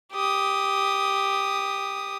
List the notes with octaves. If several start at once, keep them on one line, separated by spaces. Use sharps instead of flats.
G4 D#6